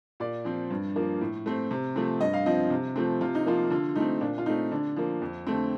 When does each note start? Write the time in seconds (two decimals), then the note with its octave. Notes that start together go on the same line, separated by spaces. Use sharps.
0.20 A#2 D5
0.45 F3 C4
0.70 G2
0.96 F3 A#3
1.21 A2
1.46 A3 C4
1.71 C3
1.96 F3 A3 C4
2.21 G2 D#5
2.33 F5
2.46 F3 C4 D#5
2.70 C3
2.96 F3 A3 C4
3.21 C3 F4
3.35 D#4
3.46 F3 A#3 F4
3.70 D3 F4
3.95 A3 C4 D#4
4.21 A#2 D4
4.38 F4
4.46 A3 C4 D#4
4.71 D3 D4
4.96 F3 A#3
5.22 F2
5.47 D3 A3 C4